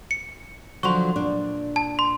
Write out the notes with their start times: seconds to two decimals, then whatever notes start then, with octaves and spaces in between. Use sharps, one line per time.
0.11 C#7
0.83 D3 F3 F#3 C6 C#6
1.16 A#2 D4
1.76 A5
1.99 C6